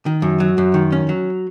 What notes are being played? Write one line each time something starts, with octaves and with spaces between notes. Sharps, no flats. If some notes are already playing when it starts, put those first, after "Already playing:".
D#3
F#2
F#3
F#2
D#3
C#4
F#3